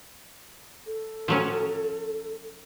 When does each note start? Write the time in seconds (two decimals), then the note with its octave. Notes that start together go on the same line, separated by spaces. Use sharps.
0.87 A4
1.28 F3 F#3 C#4